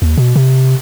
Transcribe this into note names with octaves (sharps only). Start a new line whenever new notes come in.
D#2
B2
C3